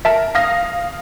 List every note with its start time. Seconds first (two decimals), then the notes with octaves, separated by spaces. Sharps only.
0.05 A#4 E5 A5
0.35 F5 D#6 A#6